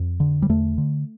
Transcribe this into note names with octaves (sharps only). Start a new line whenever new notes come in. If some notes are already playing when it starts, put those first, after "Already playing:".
Already playing: F2
D3
G3
E2 A3
D3